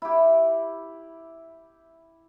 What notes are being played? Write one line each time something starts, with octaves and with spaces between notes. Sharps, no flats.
E4 G4